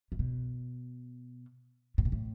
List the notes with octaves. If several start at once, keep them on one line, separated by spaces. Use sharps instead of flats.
A2
B2
A2
B2
A2